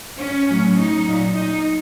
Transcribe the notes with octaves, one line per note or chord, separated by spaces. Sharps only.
C#4
A2 F#3
D#4
A#2 F#3
D#4